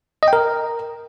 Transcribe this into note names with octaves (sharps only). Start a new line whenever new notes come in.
D#5
G5
A#4